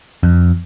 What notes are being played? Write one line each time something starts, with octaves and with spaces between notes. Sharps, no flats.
F2